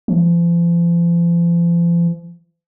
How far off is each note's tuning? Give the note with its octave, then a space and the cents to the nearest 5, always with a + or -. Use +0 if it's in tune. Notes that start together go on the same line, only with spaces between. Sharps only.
F3 -40